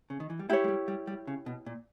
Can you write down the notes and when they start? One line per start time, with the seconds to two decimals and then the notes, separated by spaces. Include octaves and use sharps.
0.10 C#3
0.20 D#3
0.30 E3
0.39 G3
0.49 G#3 E4 G4 C#5
0.64 G#3
0.68 G3
0.88 G3
1.07 G3
1.27 C#3
1.46 B2
1.66 A#2